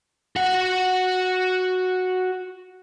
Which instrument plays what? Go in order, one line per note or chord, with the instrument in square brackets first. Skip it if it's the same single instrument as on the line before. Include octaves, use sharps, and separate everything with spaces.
[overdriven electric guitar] F#4 F#5